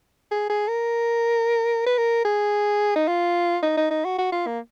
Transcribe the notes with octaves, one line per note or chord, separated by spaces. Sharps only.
G#4
G#4
A#4
B4
A#4
G#4
D#4
F4
D#4
D#4
D#4
F#4
F#4
F4
A#3